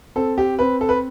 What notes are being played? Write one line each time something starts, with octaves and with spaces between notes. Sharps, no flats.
C4 A4
G4
C4 B4
A4
B4